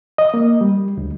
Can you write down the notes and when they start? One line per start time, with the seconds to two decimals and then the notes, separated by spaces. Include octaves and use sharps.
0.18 D#5
0.34 A#3
0.61 G3
0.97 D2